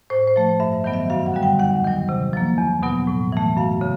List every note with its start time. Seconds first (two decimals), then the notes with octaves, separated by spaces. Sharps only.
0.10 A2 C5
0.27 C5
0.36 F3 A3
0.60 G2 E5
0.84 D#3 F#3 B3
0.93 E5
1.10 F#2 F5
1.26 F#5
1.34 D3 G3
1.43 G5
1.59 D#2 F#5
1.84 D#3 F#3
2.09 C3
2.33 F3 A#3
2.58 E2
2.83 B2 F#3 B3
3.08 A2
3.32 E3 A3
3.57 F#2 F5
3.81 C#3